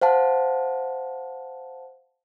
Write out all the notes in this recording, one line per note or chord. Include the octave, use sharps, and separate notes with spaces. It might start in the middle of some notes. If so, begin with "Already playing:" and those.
C5 F5 F#5 A5